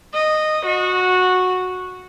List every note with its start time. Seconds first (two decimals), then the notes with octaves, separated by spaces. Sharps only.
0.14 D#5
0.66 F#4